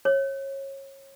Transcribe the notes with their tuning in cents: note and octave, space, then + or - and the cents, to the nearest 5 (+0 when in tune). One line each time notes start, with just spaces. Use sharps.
C#5 -25